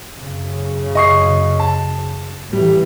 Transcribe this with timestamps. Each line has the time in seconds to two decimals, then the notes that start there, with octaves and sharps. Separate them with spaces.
0.18 F#2 C#3
0.95 D#5 C#6 C7
1.60 A5
2.53 A2 E3 G3